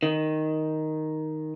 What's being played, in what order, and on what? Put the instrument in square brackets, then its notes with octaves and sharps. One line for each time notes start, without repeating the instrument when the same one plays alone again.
[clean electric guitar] D#3